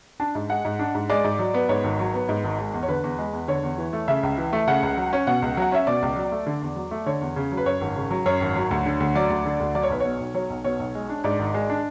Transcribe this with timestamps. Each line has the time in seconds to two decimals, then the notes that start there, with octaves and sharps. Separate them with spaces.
0.20 D4 A5
0.35 G#2
0.49 G#3 F#5
0.65 G#2
0.79 D4
0.95 G#2
1.10 G#3 D5
1.24 G#2
1.39 F#3
1.54 B3
1.69 G#2 C#5
1.84 G#1
1.99 F#3
2.14 B3
2.29 G#2
2.44 G#1
2.59 G#3
2.74 E2
2.83 C#5
2.88 D3 B4
3.04 E2
3.18 G#3
3.33 E2
3.48 D3 C#5
3.63 E2
3.78 E3
3.93 A3
4.08 C#3 E5
4.23 C#2
4.38 E3
4.53 A3
4.68 C#3 F#5
4.83 C#2
4.97 F#3
5.13 C#4
5.27 B2 F#5
5.42 C#2
5.57 F#3 F#5
5.72 C#4 E5
5.87 B2 D5
6.02 C#2
6.16 F#3
6.32 A3
6.47 D3
6.62 E2
6.76 F#3
6.91 A3
7.06 D3 C#5
7.21 E2
7.36 C#3
7.52 F#3
7.57 B4
7.66 F#2 C#5
7.81 G#1
7.96 C#3
8.11 F#3
8.26 F#2 C#5
8.41 G#1
8.56 F#3
8.71 D2
8.86 D3
9.00 D2
9.15 F#3 D5
9.30 D2
9.45 D3
9.60 D2
9.75 F#3 D5
9.83 C#5
9.90 B1 B4
10.00 B2 C#5
10.20 B1
10.34 F#3 C#5
10.50 B1
10.64 B2 C#5
10.80 B1
10.95 G#3
11.10 D4
11.24 G#2 D5
11.39 G#1
11.54 G#3
11.69 D4